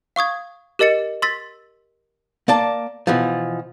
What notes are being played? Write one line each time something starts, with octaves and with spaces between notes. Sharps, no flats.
F5 C#6 D#6 G#6
G4 A#4 D#5 A6 C#7
C6 E6 A6 B6
A#3 D5 A5
B2 E3 F3